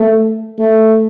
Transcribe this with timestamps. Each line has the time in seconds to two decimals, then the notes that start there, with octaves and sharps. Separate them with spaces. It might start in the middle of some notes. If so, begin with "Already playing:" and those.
Already playing: A3
0.58 A3